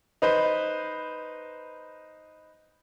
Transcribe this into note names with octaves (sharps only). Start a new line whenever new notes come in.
D#4 B4 C5 D#5